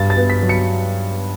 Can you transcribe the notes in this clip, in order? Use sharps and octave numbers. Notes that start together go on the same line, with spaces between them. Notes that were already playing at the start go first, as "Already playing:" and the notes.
Already playing: G2 G3 A6
A6
B3
B6
F#3
C#7